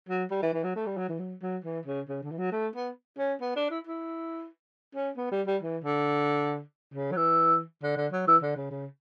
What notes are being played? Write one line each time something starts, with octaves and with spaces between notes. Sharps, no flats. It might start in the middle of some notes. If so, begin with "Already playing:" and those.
F#3
G3
E3
E3
F#3
A3
G3
F#3
E3
F#3
F#3
E3
C#3
C#3
D3
E3
F#3
A3
B3
C#4
B3
D4
E4
E4
C#4
B3
G3
G3
E3
D3
C#3
F#3
E3
D3
D3
F#3
E3
D3
C#3
C#3